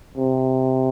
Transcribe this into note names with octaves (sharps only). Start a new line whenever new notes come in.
C3